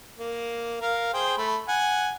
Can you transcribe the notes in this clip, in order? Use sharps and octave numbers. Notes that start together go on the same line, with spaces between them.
A#3
A#4 F5
G#4 C5 G5
A3 B5
F#5 G#5